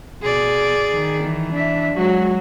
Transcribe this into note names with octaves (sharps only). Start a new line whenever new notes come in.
B2 G#4 D5
D#3
E3
D4 E5
F#3 G#3 F#4